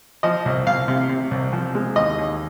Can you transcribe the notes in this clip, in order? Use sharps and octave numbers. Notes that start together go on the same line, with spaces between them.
F3 D#5
C2
C2 F5
C3
C3
C2
F3
G#3
D#2 D#5
D#2